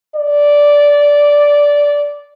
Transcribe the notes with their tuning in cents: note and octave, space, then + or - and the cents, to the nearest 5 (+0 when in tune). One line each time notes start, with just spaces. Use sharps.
D5 -10